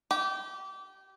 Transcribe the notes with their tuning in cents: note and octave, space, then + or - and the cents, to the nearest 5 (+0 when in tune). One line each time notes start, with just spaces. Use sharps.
G4 -25